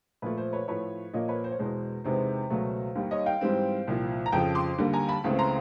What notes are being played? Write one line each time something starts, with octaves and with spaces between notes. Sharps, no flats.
A#2 F3 A3 B4
C5
B4 C#5
A2 F3 A3 B4 C#5
A#2 F3 A#3 C#5 D#5
B4 C#5
C5
C#5
E2 B2 G#3 C5
E2 C3 D#3 G#3 B3 C5
C#2 B2 F#3 A3
D#2 D#3 G3
C#5 D#5
F5 G5
G#2 E3 G3 C4
C2 A#2 F3
A#5
F2 C#3 F3 G5 A5
C6 D6
D#2 D3 G3 A#3
G#5 A#5
A5 B5
C#2 C#3 E3 A3 C4
A#5 C6